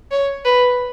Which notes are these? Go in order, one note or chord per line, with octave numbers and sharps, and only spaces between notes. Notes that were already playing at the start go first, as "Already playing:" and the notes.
C#5
B4